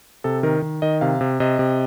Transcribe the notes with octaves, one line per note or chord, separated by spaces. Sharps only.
C3 A4
D#3 A#4
D#3
D#3 D#5
C3 F5
C3
C3 D#5
C3